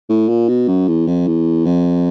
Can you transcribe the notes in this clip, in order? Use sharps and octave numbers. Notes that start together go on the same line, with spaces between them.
A2
A#2
B2
F#2
E2
F2
E2
F2